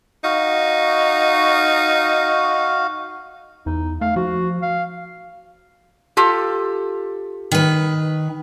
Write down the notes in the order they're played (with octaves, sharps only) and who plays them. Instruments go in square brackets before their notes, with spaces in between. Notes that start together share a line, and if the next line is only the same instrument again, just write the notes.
[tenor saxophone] D#4 [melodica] F#4 F5
[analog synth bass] E2 [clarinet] D#4
[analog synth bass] A3 [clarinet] F5
[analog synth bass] F3 [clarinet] F#4
[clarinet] F5
[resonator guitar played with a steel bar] F4 G4 A4
[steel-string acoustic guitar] D#3 B4